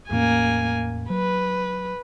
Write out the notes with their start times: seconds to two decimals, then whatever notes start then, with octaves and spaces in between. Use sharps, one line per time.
0.11 E2 A2 A#3 C#4 G#5
1.10 F#3 B4